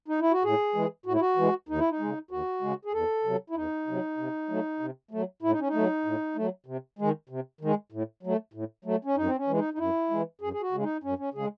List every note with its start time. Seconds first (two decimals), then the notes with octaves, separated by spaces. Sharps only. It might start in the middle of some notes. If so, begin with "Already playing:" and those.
0.08 D#4
0.20 E4
0.32 F#4
0.44 A2 G#4
0.74 E3 G#3
1.06 A2 F#4
1.13 E4
1.21 F#4
1.37 E3 G#3
1.69 D#2 D#4
1.79 E4
1.90 D#4
1.99 C#3 G#3
2.31 D#2 F#4
2.61 C#3 G#3
2.85 G#4
2.93 E2 A4
3.24 C3 F#3
3.50 E4
3.55 E2 D#4
3.87 C3 F#3
4.17 C3
4.49 F#3 A3
4.80 C3
5.11 F#3 A3
5.42 A2 E4
5.51 D#4
5.60 C#4
5.67 D#4
5.74 F#3 A3
6.05 A2
6.36 F#3 A3
6.66 C3
6.99 D#3 G#3
7.29 C3
7.61 D#3 G#3
7.92 A2
8.23 F#3 A3
8.53 A2
8.84 F#3 A3
9.05 C#4
9.16 F#2 D#4
9.26 C4
9.37 C#4
9.48 E3 G#3
9.58 D#4
9.74 D#4
9.78 F#2 E4
10.10 E3 G#3
10.41 F#2 G#4
10.53 G#4
10.62 F#4
10.72 C#3 G#3
10.83 D#4
11.03 F#2 C#4
11.18 C#4
11.34 C#3 G#3 G#4